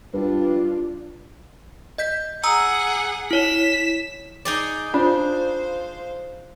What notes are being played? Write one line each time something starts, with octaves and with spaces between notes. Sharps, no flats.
G2 D4 F4 B4
D#5 G6 B6
G#4 F#5 A#5 D#6 E6
E4 C#5 B6 E7
D#4 G#4 D5
D4 F4 C5 F5